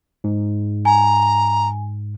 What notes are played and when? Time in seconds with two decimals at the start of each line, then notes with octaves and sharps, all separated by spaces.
0.24 G#2
0.85 G#5 A#5